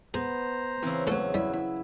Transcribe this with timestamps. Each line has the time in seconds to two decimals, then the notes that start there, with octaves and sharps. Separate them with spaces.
0.14 B3 G#4 C5 A#5
0.82 C#3 E3 C4
1.07 E2 A2 F#3 F#4 A4
1.34 G3 E4
1.53 E4